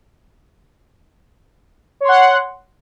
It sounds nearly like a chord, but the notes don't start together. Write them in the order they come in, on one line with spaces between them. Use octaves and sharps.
C#5 C6 F#5